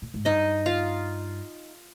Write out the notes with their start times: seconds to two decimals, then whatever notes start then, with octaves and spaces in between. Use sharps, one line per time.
0.02 A#2
0.14 G#2
0.25 G2 D#4 D#5
0.66 F4 F5